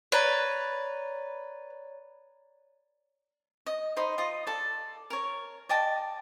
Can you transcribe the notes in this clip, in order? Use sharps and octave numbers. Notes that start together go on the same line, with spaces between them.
B4 C#5 D5 A#5
D#5
D#4 C5 D#5 B5
F4 D#5
A4 D5
A#4 C#5
D5 D#5 G5 A5